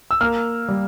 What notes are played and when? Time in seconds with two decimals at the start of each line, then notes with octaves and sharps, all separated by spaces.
0.11 E6
0.21 A#3 F6
0.69 G3